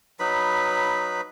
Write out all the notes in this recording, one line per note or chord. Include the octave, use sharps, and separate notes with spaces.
F#3 D#4 B4 B5